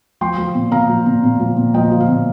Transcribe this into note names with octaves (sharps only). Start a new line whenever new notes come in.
F3 G5 C6
F3
A#2
A#2 F5 A#5
F3
A#2
A#2
F3
A#2
F3 D#5 G5
F3
F5
A#2